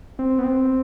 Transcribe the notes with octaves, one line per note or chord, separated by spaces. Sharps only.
C4
B3
C4